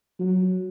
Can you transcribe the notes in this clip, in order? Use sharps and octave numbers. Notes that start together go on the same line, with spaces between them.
F#3